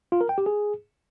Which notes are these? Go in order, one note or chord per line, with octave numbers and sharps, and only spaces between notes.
F4
A#4
G5
G4
G#4